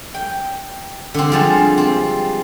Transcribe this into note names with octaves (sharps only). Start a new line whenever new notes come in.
G5
D3 C4
F3 G3 G#3
C4